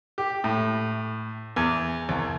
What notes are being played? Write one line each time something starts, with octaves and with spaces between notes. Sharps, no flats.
G4
A2
E2
C2